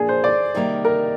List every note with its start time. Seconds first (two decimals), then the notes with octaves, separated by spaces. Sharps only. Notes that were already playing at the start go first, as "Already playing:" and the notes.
Already playing: A#2 F3 A#3 D4 G#4
0.09 C5
0.24 D5
0.55 C3 D#3 G3 A#3 D#4
0.85 A#4